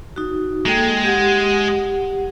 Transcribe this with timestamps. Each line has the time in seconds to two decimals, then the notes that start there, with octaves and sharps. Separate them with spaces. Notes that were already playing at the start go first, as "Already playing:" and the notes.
0.16 D#4 F#4
0.66 G#3 A#3 A4 G5
1.04 G4 F#5